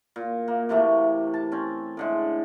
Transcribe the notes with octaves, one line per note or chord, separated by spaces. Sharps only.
A#2
A#3
C3 E3 A3 A#3
A5
C4 C#4
A2 D3 G#3